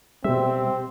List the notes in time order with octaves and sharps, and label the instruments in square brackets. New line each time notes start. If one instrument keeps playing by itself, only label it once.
[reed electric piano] B2 E5 [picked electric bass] G3 [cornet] C4